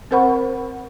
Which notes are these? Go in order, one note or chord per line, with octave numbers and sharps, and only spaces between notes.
C4 A#4 C5 F#5 B5 C#6